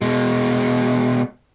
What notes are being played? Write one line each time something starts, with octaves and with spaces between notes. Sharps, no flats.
B2 G#3